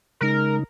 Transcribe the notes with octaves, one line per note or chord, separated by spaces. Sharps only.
C#3 G#3 D#4 A#4